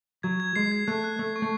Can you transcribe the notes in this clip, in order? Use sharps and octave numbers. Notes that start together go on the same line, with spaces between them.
F#3 G#6
G#6
G#3 C7
G#6
A3 F#6
F#6
A3 F#6
C#6
A3